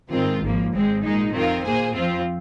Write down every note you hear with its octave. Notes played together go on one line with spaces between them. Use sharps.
G#2 D#3 G#3 C4 F4
G#1 G#2 F3 A#3
G#1 G#2 G#3 C4
A#2 G#3 D#4
F2 D#3 C4 F4 A#4
A#2 A#3 G#4 C5
F2 F3 C4 F4